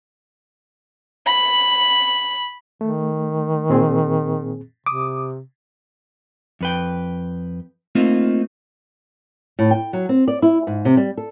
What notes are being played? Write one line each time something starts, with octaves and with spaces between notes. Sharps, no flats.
B5
D#3 A3
A#2 C4 G#4
C3 D6 D#6
F2 B4 G5
A3 A#3 C4 D#4 F4
A2
G5
F#3
C4
D5
E4
G#2
C3
G3
A4